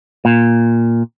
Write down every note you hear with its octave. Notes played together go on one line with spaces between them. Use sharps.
A#2